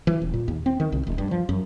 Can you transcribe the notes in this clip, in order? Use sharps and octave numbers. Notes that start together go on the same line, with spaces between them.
E3
D#1
A#2
D#2
C4
D#3
C2
D#1
G2
F3
F#2